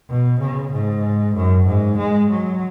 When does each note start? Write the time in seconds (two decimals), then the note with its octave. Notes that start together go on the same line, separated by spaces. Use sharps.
0.10 B2
0.41 C#3
0.73 G#2
1.36 F#2
1.67 G#2
1.99 G#3
2.30 F#3